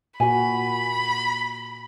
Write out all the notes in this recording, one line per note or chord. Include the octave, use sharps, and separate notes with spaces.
A#2 F#4 G#5 B5